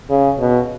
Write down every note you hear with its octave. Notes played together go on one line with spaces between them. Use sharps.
C#3
B2